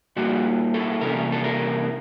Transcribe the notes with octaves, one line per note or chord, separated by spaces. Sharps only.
A#2 G3 A#3 F#4
A4
C3 E3 G3 A#3 C#4 A#4
A4
A#4